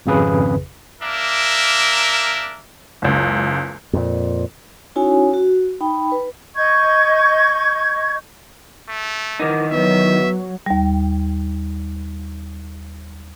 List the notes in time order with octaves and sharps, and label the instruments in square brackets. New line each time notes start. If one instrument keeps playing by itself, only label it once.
[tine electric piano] G#1 F2 C#3 G#4 B4
[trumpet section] A#3 D4 A#4 E5
[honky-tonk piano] F#1 C#2
[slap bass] F2 A#2
[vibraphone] C#4 D#4 E4 F#4 C#5 G#5
F#4
D#4 G5 B5
B4
[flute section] D#5 C#6 G6 G#6
[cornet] A3
[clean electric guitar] D#3 E3 D#4 [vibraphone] A#4 F#5 D6
[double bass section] F#3 [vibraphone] B3 B4 [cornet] E5
[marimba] D#2 G3